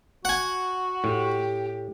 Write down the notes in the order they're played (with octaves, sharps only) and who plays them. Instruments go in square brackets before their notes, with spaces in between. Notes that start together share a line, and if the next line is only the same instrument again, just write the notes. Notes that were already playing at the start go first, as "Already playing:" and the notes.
[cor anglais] F#4 [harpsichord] F#5 G#5
[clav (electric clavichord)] A2 [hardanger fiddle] G4